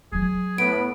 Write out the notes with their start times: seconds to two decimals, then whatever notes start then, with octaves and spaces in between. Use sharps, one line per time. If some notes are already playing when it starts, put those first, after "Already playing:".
0.12 F#3 C#4 G#4
0.58 A2 B3 B5 D7